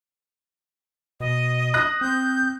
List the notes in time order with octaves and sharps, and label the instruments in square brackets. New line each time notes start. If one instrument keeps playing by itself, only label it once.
[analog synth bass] B2 [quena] D#5
[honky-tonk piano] D#6 F#6 A#6
[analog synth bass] C4 [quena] G6